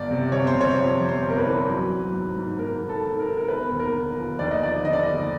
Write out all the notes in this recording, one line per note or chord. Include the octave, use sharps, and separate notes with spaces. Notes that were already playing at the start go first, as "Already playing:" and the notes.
Already playing: G1 D5
C3
G1 C#5
C5
C3
C#5
F2
F2
C5
G1
A#4
B4
E3
F#3
F#3
G#2
G#2
G#2 A#4
D#3
A4
D#3
A#4
D#3
A#4
E1 B4
D#2
A#4
D3
F3
D#2 D5
D#5
F3 D5
D3 D#5
D5
D#2 D#5